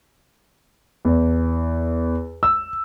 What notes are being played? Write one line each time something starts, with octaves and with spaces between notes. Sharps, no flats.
E2
E6